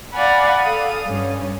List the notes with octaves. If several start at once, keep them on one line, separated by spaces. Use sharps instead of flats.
D5 F5 F#5 G#5 B5
A4 F5 D#6
G2 C#4